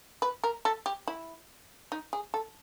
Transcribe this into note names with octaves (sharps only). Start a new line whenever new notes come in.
B4
A#4
A4
G4
E4
D#4
G#4
A4